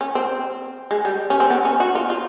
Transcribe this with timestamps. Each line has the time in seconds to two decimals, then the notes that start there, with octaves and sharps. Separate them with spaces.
0.01 C#4
0.15 C4
0.91 G#3
1.05 G3
1.30 C#4
1.40 C4
1.50 B3
1.65 C#4
1.80 F#4
1.95 F4
2.10 F4